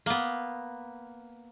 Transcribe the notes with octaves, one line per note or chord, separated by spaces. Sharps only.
A#3 B3